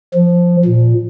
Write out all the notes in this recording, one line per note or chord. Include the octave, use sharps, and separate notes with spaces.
F3
A#2